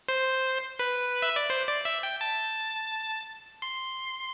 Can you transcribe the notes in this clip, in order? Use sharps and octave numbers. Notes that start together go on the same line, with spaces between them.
C5
B4
E5
D5
C5
D5
E5
G5
A5
C6